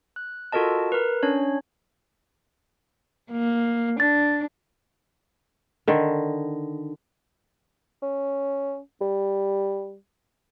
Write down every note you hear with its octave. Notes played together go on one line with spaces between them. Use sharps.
F#6
F4 F#4 A4 A#4 D#5 A5
A#4 B4
C#4 D4 C#5
A#3
D4 A6
D3 D#3
C#4
G3